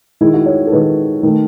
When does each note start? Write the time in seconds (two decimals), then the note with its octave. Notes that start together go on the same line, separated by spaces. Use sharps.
0.21 D#3 G#3 E4
0.34 F#4
0.46 C#5
0.67 A4
0.72 D#3 G#3 B4
1.23 D#3 A3